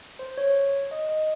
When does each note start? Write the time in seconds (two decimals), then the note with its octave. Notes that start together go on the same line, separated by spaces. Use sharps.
0.19 C5
0.38 C#5
0.91 D#5
1.09 D#5